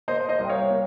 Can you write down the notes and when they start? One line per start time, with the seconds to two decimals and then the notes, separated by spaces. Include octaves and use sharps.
0.08 A#3 C5 D#5
0.29 C5 D#5
0.39 C2
0.45 G5
0.49 C#5 F5
0.70 A#3